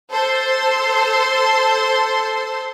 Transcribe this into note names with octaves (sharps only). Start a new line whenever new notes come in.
A4 C5 C6